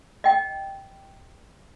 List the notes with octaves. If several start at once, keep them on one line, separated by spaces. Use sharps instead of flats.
D#5 G5